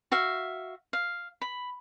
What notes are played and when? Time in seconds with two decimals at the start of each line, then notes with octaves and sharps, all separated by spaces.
0.12 F#4 E5 F5
0.93 F5
1.42 B5